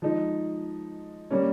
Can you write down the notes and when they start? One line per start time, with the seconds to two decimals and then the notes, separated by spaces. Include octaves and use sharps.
0.02 F3 G#3 D#4
1.30 G3 A#3 C#4